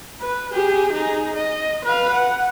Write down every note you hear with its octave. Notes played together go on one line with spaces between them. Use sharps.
B4
G4 G#4
D#4 G#4
D#5
B4 F5
F#5